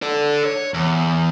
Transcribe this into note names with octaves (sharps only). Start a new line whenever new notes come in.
A4 D5
C#5
E2